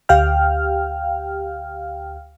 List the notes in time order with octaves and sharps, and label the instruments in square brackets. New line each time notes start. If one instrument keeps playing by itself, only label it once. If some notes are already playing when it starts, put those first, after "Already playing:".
[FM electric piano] D2 G4 F5 G5 F6